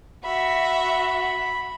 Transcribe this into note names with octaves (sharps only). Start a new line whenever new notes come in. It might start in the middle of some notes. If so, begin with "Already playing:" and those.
F#4 E5 B5